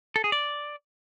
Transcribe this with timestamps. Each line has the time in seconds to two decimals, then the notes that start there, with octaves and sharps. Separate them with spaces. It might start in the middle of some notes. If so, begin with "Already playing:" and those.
0.16 A4
0.24 G#4
0.32 D5